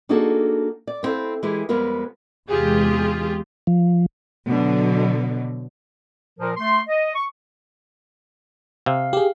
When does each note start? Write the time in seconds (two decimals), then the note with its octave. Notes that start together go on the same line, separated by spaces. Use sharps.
0.09 A#3 D4 D#4 F#4 G#4 A4
0.87 D5
1.03 B3 C4 E4 A4 F5
1.43 E3 G#3 E4 G4 G#4
1.69 F2 G3 G#3 B3 A#4 F5
2.49 E2 C3 G#3 F4 G4 G#4
3.67 F3
4.48 B2 D3 F#3
6.39 A#2 F3 A#4
6.57 A3 C6
6.88 D#5
7.14 C#6
8.86 C3 F5
9.13 G4 G#4